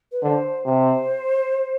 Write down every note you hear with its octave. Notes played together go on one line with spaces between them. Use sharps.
B4
D3 C5
C3 C5